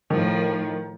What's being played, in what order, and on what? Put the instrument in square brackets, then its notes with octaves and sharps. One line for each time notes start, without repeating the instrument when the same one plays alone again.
[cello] A2 F3 [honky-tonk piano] D#3